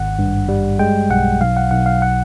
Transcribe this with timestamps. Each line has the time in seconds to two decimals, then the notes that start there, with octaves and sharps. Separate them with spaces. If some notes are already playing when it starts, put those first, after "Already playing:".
Already playing: G#1 F#5
0.19 G2
0.49 G3
0.79 G#3 G5
1.10 B1 F#5
1.41 B1 F5
1.57 F#5
1.71 B1 F#5
1.86 F5
2.02 F#5